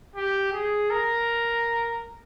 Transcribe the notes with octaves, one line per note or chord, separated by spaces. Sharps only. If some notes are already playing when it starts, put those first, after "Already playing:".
G4
G#4
A#4